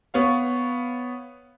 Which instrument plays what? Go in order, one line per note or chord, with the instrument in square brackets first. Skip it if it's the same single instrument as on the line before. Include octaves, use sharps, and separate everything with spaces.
[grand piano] B3 C#5 F5